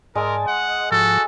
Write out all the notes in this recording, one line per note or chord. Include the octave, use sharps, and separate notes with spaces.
G#2 G#3 A#4 D5 G#5 A5 E6
D#5 F#5
G#2 F3 F#4 A4